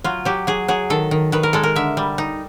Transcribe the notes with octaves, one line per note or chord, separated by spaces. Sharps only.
F#3 F4
F#3 G4
F#3 G#4
F#3 G#4
D#3 A4
D#3
D#3 B4
A#4
G#3 A4
A#4
D3 E5
G3
D#4